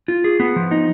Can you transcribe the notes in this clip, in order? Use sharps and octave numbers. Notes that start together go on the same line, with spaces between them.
F4
G#4
B3
F3
D#4